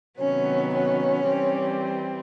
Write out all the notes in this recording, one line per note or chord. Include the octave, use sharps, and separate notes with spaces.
C3 D#3 F#3 B3 C#4
C#4
E3 G3 C4